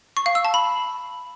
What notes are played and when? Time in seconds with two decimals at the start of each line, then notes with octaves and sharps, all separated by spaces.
0.17 C#6
0.26 F5
0.35 E6
0.45 A5
0.54 B5